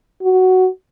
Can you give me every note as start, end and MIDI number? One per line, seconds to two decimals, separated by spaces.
0.22 0.67 66